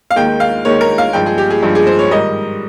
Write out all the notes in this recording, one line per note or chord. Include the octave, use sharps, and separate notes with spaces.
F5
D#2 D#3 G#3 G5
F5
D#2 D#3 G#3 C#5
A#4
F5
G2 F3 G#3 G5
G#4
G4
G#4
G2 F3 G#3
G#4
C5
C#5
G#2 D#3 G3 D#5